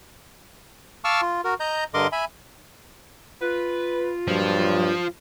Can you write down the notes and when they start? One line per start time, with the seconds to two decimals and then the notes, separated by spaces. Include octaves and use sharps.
1.04 F5 A5 C#6 D6 E6 F6
1.22 F4
1.44 F#4 A#4
1.60 D#5 A#5 G6
1.94 G2 D3 A#4 D#5 C6 D6
2.12 E5 G#5 B5
3.41 F4 B4
4.28 G2 A#2 F3 F#3